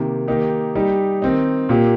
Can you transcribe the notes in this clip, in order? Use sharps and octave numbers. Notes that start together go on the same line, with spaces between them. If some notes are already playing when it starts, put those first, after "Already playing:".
Already playing: C3 D#3 A#3 G4
D#3 A#3 D#4 G4
G3 D#4 G4
D#3 C4 D#4
A#2 A#3 G4